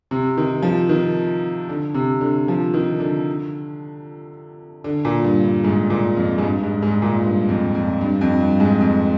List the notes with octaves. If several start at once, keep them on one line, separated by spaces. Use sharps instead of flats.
C3
D#3
F3
D#3
D3
C3
D3
F3
D#3
D3
D3
A#2
G2
G2
G#2
A#2
F2
G#2
G2
G#2
G#2
A#2
G2
F2
F2
G2
F2
G2
G#2
F2